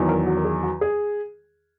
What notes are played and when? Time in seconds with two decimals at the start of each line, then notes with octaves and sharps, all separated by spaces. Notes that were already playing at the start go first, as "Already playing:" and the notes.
Already playing: E2 D#3 F#3
0.09 A#4
0.27 F#4
0.37 A#4
0.45 G#4
0.63 F#4
0.81 G#4